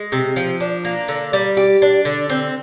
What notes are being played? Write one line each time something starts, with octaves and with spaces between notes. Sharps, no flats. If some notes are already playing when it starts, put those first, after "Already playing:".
Already playing: G#3
C3
F3
D4
A#3
D3
G3
G4
D4
D3
C4